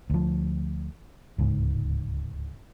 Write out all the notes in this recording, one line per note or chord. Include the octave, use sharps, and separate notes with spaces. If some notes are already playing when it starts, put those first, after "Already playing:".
D2 F3
D1 C#2 G#2